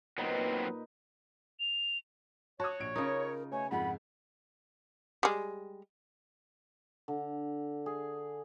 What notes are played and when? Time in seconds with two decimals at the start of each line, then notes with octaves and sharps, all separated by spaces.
0.18 A#2 F#3 B3 C4 D#4 B4
1.60 F7
2.60 F#4 C#5 A5 D#6
2.80 A#1 D7
2.96 C#3 D#4 F4 A#4
3.52 B2 A3 C#5 G#5
3.71 C2 F2 G#2 F4 F#5 B5
5.23 G3 G#3
7.08 D3
7.86 G#4